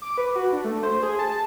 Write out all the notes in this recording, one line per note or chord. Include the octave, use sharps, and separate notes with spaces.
D6
B4
F#4
D4
A3
C5
G#4
A5